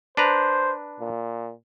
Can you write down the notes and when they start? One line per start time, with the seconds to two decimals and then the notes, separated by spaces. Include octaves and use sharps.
0.17 D4 B4 C5 A#5
1.00 A#2